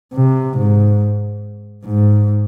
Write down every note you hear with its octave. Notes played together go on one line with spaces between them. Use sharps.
C3
G#2
G#2